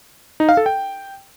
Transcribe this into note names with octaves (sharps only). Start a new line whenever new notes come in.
D#4
F5
A4
G5